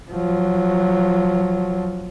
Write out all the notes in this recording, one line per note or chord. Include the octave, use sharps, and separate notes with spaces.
F3 F#3